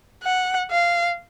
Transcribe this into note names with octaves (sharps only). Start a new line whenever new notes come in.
F#5
F5